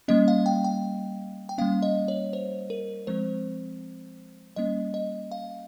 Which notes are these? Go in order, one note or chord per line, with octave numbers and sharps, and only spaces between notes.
G3 A#3 C#4 D#5
F5
G5
G5
G5
G3 A#3 C#4 F5
D#5
C#5
C5
A#4
F3 G#3 C4 C5
G3 A#3 C#4 D#5
D#5
F5